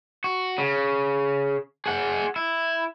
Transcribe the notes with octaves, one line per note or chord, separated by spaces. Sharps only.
F#4
C#3
G#4 F#5
E4